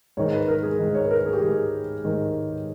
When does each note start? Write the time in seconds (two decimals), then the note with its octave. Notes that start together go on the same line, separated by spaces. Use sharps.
0.17 G#2 D#3 C#5
0.33 B4
0.48 A#4
0.63 G#4
0.79 G#2 D#3
0.95 C#5
1.04 B4
1.11 A#4
1.26 G#4
1.33 G4
1.40 G#2 D#3 G#4
2.04 G#2 D#3